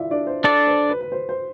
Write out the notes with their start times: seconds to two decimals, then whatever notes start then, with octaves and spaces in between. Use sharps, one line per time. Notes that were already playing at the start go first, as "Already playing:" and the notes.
Already playing: E4 F4 D5 E5 F5
0.11 D4 D5
0.27 C5
0.44 D4 A4 D5
0.67 C5
0.89 B4
1.01 B4
1.12 C5
1.29 C5